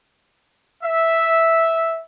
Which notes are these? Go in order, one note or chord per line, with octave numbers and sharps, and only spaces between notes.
E5